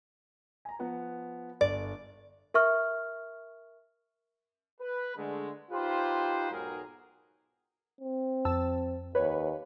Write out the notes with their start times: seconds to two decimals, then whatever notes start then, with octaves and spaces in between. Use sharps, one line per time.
0.65 G#5 A#5
0.79 F3 B3 F#5
1.61 G1 D5
2.54 A#4 E5 C#6 F6
4.81 B4
5.16 D3 G#3 A3
5.71 D#4 F4 G4 B4 C5
6.51 B1 G#2 F#3 G#4 A#4
8.01 C4
8.45 F2 A5 E6
9.15 D#2 B4 C#5